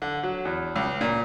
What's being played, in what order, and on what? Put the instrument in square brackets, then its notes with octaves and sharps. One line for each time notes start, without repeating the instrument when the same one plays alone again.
[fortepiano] D3
F#3
E2
C#2
A#2